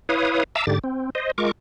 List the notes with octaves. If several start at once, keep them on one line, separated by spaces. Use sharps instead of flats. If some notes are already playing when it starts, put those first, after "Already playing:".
E4 B4 C#5 F5 D#6
E5 F5 A5 A#5 D6 E6
G#2 D3 G4 A6
C4
C5 D#5
G#3 F4 A#4 C#6 D6